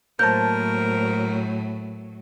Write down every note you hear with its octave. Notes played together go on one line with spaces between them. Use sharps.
A2 F#3 A#3 A#4 C5 A5 G6